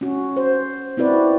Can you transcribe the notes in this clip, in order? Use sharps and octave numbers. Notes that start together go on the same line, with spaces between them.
C#4 F#4
C5
C4 E4 F#4 B4 D5